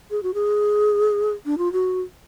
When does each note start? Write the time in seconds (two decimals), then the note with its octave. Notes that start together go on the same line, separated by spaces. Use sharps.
0.11 G#4
0.23 F#4
0.34 G#4
1.46 D4
1.58 F4
1.73 F#4